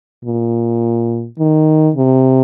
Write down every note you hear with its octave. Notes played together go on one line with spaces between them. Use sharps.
A#2
D#3
C3